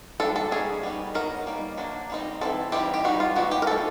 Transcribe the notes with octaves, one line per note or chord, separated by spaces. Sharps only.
G3 A#3 D4 A4
A4
D#3 G3 A#3 C#4 G#4
G3 B3 D#4
D#3 F#3 B3 D#4 A#4
G3 A#3 D#4
F#3 A#3 D4
G3 C4 D#4
E3 G3 C4 A4
E3 G3 C4 D#4 G4
G4
D#3 G3 C4 D#4 F#4
F4
E3 G#3 B3 D#4 F#4
G4
A#4
F3 A#3 D#4 A4